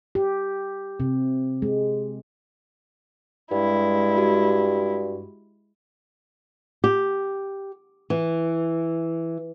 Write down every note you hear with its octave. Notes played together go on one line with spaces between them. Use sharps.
G4
C3
G#3
G2 G#3 E4 G4
F#4 G4
G4
E3